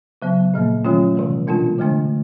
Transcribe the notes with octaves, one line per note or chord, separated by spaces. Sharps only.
C#3 F#3 B3
A#2 F3 A#3
D#3 F#3 A3 C#4 F4
C3 E3 G3
B2 G#3 B3 D4 F4
D3 F3 A3 D4